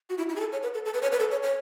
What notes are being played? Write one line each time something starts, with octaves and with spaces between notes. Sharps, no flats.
F#4
E4
E4
G#4
A4
C#5
B4
A4
A4
B4
C#5
B4
A4
C#5
C#5